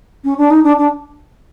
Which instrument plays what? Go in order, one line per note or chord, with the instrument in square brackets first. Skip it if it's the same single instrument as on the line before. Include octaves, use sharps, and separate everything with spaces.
[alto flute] C#4
D4
D#4
D4
D4